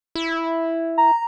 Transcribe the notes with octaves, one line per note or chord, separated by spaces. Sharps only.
E4
A#5